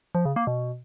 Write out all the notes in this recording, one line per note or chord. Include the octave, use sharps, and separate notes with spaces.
F3
C#3
A#3
B2